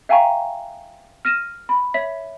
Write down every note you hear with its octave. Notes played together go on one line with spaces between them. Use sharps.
E5 F5 G5 G#5 A#5 C#6
F6 A#6 D#7 E7
B5
C#5 E5 B6